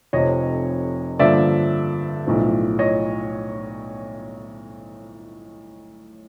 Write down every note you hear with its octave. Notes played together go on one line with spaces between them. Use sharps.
F1 F2 C3 C#5 D#5
G2 D3 F3 A#3 D5 E5
B1 A2 F3
C#5 D#5